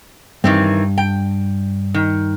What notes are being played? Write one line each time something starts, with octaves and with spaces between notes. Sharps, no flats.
G2 D#3 E3 C4
G5
D#3